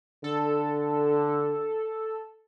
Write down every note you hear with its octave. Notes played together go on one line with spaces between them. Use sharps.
D3 A4